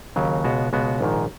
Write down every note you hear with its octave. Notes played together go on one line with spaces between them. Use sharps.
D#2 C#3 F#3
C#2 B2 G#3 B3 F#4
C#2 B2 G#3 B3 F#4
A#1 G#2 D#3